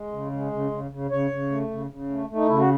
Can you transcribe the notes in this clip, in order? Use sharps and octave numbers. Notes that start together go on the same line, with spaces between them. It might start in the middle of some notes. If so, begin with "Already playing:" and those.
Already playing: G#3
C#3
G#3
C#3
C#3
C#3
C#3 C#5
C#3
A3
C#3
C#3
A3
A3
D#4
C#3 E4
F#4